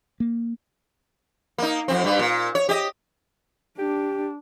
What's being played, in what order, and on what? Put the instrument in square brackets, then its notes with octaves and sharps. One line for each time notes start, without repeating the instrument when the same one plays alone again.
[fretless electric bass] A#3
[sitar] A#3 D#4
F2 C4
G2 G3
A#2
C#5
G4 D#5
[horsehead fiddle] D4 [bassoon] G4